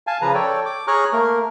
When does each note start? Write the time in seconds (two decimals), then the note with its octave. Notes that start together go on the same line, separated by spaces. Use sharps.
0.07 F5 G#5 A5
0.22 C#3 F3 B4 A#5
0.34 A4 C#5 D5 G5
0.66 D6
0.88 G#4 C#5 A#5 C#6 F6 F#6
1.13 A3 A#3 A#4